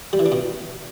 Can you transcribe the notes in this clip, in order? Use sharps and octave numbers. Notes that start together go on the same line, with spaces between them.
G3
E3
D4
B2